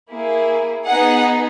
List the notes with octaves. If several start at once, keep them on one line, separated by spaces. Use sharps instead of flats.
A#3 E4 G#4
B3 D#4 G#4 F#5